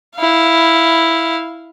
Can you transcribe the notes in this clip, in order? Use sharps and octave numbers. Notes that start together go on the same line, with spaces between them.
E4 F5